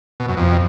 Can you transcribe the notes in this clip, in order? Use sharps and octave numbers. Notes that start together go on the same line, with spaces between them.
B2
F#2
F2